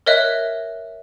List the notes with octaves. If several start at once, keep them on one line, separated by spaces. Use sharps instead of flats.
A#4 C#5 D#5 E5 F#6